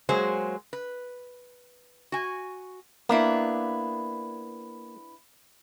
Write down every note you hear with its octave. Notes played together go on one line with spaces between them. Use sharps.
F#3 G#3 A#3 G#4 C5
B4
F#4 G#5
A#3 B3 D4 E4